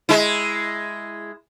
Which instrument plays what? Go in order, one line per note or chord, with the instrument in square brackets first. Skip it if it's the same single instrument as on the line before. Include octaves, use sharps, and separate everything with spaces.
[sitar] G#3 E4